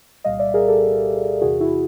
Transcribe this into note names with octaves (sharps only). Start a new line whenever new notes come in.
C2 A#2 G3 D#5 F5
D5 E5
G#4 A#4
G4 A4
E2 C3 E3 F#4 G#4
E4 F#4